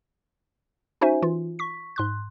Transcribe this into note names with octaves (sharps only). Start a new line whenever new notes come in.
C#4 D#4 F#4 C5 E5 G#5
E3 F4
C#6 B6
G#2 C6 F#6